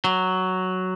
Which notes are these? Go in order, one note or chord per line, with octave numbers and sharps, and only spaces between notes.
F#3